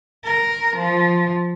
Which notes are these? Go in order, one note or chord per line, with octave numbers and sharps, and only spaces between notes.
A#4
F3